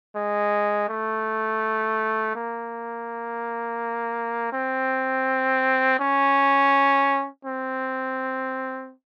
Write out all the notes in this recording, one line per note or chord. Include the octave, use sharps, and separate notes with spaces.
G#3
A3
A#3
C4
C#4
C4